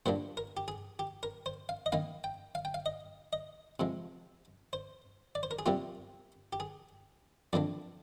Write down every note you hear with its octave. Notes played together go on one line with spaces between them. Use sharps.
A#2 G3 A#3 D4 C5
A#4
G4
G#4
G4
A#4
C5
F5
D#5
D#3 A#3 D#4 F5
G5
F5
G5
F5
D#5
D#5
C3 F3 G#3
C5
D5
C5
A#4
G#4
C3 G3 A#3 F4 G4
G4
G#4
F2 D#3 A#3 D4 D5